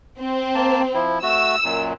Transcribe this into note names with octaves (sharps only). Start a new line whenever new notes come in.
C4
A#3 A5
F3 E4
A3 F#4 E6
F#2 A#2